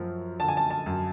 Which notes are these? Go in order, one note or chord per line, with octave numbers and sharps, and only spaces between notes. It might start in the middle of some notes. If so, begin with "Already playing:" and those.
Already playing: F#2 F3
D3 A5
G#5
A5
A5
F#2